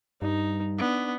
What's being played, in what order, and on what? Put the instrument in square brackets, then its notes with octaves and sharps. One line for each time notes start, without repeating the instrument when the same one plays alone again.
[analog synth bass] G2 [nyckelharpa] D#4
[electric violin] B3 [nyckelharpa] D4